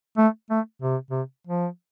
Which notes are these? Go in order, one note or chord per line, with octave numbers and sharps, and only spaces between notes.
A3
A3
C3
C3
F3